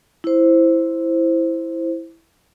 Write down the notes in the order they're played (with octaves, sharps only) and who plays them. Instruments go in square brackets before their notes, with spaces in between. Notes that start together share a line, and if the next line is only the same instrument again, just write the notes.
[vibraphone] E4 C5